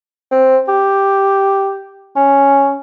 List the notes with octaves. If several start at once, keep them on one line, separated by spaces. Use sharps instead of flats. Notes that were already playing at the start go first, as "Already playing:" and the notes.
C4
G4
C#4